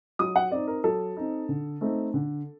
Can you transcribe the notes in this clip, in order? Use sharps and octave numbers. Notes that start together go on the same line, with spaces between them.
F#3 D#6
F#5
C4 D#4 D5
A#4
F#3 A4
C4 D#4
D3
A3 C4 D#4
D3